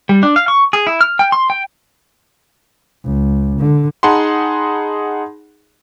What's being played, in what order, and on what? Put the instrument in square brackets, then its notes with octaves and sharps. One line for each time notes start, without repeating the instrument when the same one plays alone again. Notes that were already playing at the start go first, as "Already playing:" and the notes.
[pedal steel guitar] G3
D4
F5
C#6
G#4
E4
F6
G5
C6
G5
[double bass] C#2
D3
[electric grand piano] D#4 G#4 F#5 A5 B5 C6